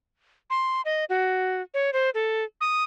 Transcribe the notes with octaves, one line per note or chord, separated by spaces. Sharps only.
C6
D#5
F#4
C#5
C5
A4
D#6